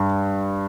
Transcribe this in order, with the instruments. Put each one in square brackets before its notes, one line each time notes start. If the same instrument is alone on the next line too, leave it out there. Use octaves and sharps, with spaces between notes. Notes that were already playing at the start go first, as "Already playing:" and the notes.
Already playing: [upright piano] G2